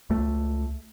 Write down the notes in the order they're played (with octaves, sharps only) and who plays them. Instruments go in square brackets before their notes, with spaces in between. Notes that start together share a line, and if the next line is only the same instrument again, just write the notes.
[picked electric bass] C#2 A3